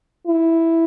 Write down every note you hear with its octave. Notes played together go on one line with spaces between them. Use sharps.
E4